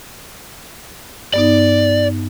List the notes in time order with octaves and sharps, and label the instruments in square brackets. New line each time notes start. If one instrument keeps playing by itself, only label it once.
[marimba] G2 B3 D#4 [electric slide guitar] D5